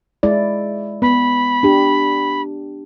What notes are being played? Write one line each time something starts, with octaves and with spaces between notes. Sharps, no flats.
G#3 E4 D5
B3 B5
D4 G4